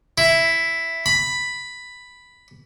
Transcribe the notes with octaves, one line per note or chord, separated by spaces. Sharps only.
E4
B5